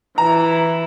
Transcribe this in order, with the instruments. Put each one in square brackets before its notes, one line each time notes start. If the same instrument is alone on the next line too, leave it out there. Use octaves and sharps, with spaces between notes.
[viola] E3 E4 [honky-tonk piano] A#5